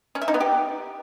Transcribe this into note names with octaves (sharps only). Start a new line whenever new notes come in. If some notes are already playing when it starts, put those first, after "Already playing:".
C#4
E5
D#4
B3
G4